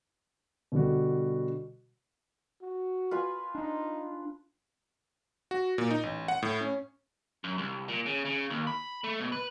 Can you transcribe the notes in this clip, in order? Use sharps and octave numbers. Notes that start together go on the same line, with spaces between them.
B2 D3 G3 F#4
F#4
F4 B4 G#5
D4 D#4
F#4
A#2
D#4
A1
F#5
A2
C#4
F#2
C2
A#2
C#3
C#3
D#2
B5
A3
B2
B4